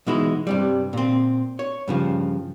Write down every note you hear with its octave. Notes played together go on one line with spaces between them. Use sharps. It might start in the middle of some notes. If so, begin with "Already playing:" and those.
B2 E3 G#3 D#4 E4
G2 C3 G3
A#2 C4
C#5
G2 C#3 F3